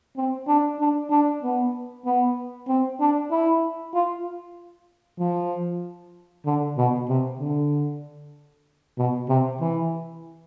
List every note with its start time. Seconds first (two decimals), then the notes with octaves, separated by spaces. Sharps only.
0.17 C4
0.48 D4
0.80 D4
1.11 D4
1.43 B3
2.05 B3
2.68 C4
3.00 D4
3.31 E4
3.95 F4
5.20 F3
6.46 D3
6.78 B2
7.09 C3
7.40 D3
8.98 B2
9.29 C3
9.61 E3